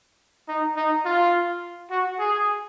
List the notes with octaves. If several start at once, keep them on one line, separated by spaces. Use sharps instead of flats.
D#4
D#4
F4
F#4
G#4